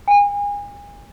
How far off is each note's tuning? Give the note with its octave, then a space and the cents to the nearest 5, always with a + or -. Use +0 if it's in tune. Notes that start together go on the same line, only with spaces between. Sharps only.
G#5 -35